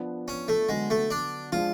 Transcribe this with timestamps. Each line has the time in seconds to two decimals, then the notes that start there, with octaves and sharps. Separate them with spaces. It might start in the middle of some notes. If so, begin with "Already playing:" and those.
Already playing: F3 B3 D4
0.28 C#4
0.48 A3
0.69 D3 F#3 G#3 B3
0.90 A3
1.11 D4
1.52 F3 G#3 D4 F4